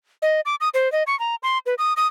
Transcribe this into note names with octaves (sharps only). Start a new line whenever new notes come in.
D#5
D6
D#6
C5
D#5
C#6
A#5
C6
B4
D#6
D#6